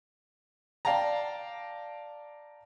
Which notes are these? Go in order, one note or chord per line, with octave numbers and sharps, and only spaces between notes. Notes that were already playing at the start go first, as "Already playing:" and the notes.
D5 F5 G5 A5 A#5